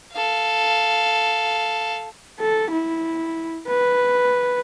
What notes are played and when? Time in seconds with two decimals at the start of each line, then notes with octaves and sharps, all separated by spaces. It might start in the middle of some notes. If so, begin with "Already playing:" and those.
0.13 A4 F5
2.40 A4
2.71 E4
3.68 B4